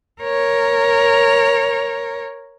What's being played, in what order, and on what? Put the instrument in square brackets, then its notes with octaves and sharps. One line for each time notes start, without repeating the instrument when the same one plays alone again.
[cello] A#4 C#5